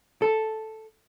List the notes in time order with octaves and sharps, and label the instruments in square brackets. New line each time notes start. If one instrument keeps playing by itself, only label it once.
[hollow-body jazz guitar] A4